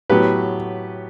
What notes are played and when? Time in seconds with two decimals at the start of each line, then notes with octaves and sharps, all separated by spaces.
0.10 A2 F#3 B3 G4 B4